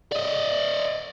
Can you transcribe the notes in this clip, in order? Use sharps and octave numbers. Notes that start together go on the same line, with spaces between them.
D5 D#5